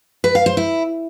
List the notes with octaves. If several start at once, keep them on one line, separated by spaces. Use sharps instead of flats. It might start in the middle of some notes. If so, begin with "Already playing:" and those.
B4
F5
C5
E4